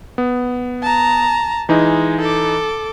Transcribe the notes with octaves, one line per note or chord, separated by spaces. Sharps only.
B3
A5 A#5
E3 G#3 D#4
A4 D6